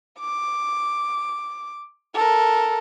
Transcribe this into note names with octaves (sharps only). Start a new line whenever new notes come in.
D6
A4 A#4